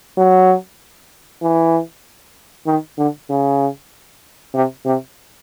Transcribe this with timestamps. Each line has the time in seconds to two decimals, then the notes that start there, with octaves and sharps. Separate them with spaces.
0.17 F#3
1.42 E3
2.67 D#3
2.98 D3
3.29 C#3
4.54 C3
4.85 C3